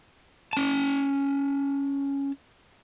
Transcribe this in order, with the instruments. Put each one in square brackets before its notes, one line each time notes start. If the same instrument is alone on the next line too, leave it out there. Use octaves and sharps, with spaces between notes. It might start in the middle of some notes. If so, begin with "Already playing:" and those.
[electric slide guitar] C#4 A5